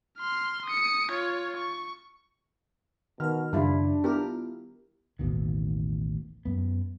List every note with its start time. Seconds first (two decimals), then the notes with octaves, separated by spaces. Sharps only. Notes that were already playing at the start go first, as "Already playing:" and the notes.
0.19 C6 F6
0.66 D#6 C#7
1.11 F4 C#5
1.57 C#6
3.20 B2 D#3 A#4 F6
3.53 F#2 C#3 G3 D4 E4 F4
4.04 B3 E4 F4 G4 A#4
5.19 A1 D#2 B2 D#3
6.45 F#2 B3